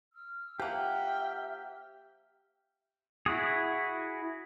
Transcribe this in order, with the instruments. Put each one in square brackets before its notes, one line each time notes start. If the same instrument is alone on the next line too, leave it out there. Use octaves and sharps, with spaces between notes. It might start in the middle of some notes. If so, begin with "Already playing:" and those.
[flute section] E6 F6
[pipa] F3 A#3 [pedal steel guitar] G4 F#5 [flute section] E5 E6 F6 [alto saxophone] G5
[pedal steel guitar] E4 F#4 G#4